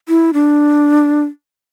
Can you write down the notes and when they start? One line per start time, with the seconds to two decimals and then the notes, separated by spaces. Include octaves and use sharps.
0.08 E4
0.33 D4